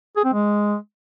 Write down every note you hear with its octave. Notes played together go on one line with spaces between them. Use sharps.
G#4
C4
G#3